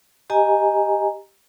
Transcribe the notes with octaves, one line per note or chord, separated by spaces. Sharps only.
G4 D#5 G#5 A#5